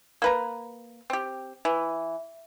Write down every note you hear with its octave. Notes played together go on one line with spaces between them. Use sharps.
A#3 B4 A#5
C4 G4
E3